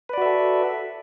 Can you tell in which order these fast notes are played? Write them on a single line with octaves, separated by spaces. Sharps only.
B4 D5 F#4 E5 A4